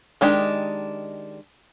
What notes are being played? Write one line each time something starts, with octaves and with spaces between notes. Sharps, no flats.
D#3 G#3 D4 G4